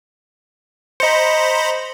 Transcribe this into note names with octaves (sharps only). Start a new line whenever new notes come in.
C5 D#5 A#5 B5 C#7